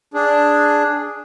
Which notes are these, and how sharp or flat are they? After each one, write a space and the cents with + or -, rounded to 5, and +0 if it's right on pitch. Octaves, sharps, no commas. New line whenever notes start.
D4 +0 G#4 +0